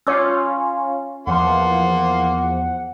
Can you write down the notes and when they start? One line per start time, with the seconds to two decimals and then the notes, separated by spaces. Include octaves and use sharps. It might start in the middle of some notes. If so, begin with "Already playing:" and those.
0.07 C#4 F4 C#5 D6 E6
1.27 E2 F3 A#3 F#5 C6